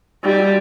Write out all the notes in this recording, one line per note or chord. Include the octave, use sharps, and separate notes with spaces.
G3 D#4
F#4